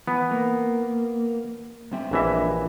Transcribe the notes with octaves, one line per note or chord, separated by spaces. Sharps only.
E3 B3
A#3
G2 C4 E5
A#1 E3 D4 G4 D#5 E5